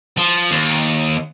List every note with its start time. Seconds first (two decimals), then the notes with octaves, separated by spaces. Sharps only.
0.17 F3
0.51 D#2